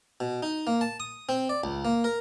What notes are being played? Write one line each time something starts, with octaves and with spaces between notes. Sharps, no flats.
B2
D#4
A#3
A5
D#6
C4
D5
C#2
A#3
A#4